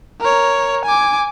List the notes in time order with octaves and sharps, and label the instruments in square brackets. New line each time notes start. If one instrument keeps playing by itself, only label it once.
[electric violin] A#4 C#5
G#5 D6